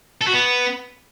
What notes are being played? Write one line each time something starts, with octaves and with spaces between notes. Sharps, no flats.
A4
F#4
B3